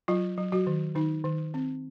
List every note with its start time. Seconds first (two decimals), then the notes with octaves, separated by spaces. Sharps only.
0.08 F#3 F4
0.38 F#3
0.52 F#3 F#4
0.67 D#3
0.95 D#3 D#4
1.24 D#3
1.54 C4